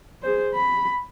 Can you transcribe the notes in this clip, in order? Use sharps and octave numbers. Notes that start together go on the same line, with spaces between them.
G#4 C5
B5